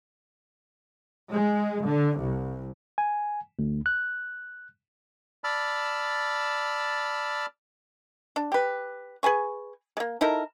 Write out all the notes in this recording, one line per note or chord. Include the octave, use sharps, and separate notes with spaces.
G#3
D3
C2
G#5
D2
F#6
D5 A5 B5 E6 F6
D4
G4 B4
G#4 B4 G#5 C#6
G#3 A#3
D#4 E4 A4 A#4